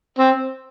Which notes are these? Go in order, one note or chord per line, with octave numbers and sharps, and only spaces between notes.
C4